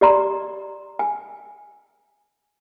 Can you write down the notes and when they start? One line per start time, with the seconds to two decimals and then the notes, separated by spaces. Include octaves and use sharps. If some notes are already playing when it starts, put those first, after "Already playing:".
0.01 G4 D5 A#5 C6
0.99 G#5